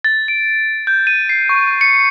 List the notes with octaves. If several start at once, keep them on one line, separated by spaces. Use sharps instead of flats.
A6
D7
G6
D#7
C7
C#6
C#7